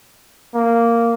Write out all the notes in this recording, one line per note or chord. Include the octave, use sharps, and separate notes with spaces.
A#3